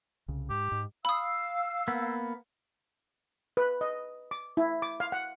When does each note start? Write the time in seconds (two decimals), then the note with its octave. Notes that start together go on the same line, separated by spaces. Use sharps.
0.28 C2 C#3
0.50 G#2 G4
0.72 G#2
1.05 F5 B5 D#6 E6
1.88 A#3 B3
3.57 B4
3.81 D#5
4.31 D6
4.57 E4
4.82 D6
5.00 F5
5.12 F#5